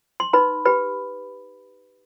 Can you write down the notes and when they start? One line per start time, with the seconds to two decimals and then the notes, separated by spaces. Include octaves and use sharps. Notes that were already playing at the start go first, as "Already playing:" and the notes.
0.20 C6
0.33 D#4 B4 B5
0.65 G4 B4 B5